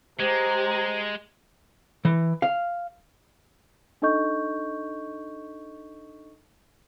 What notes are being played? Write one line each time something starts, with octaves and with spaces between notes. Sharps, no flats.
G#3 G4 C5 A#5
E3
F5
D4 D#4 A4 D#5 C#6 G6